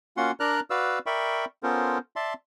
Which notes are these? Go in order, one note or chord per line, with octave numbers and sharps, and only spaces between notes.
A#3 C#4 F4 F#4 F#5 C6
D4 A#4 D5 A#5 F6 F#6
F#4 B4 D5 F5 E6
A#4 D5 E5 G5 B5 C#6
B3 C#4 F4 A4 A#4 C5
D5 E5 A5 C6